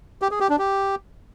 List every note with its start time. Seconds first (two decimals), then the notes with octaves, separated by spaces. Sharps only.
0.22 G4
0.31 G#4
0.40 G4
0.49 D4
0.59 G4